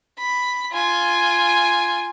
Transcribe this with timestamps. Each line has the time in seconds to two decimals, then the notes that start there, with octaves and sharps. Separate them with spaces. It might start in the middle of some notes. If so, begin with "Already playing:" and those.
0.18 B5
0.72 F4 G#5